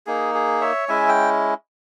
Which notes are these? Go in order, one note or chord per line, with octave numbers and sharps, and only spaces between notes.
A#3 D#4 G#4
G#4
C#5 E5
G#3 C#4 E4 E5 G#5
G5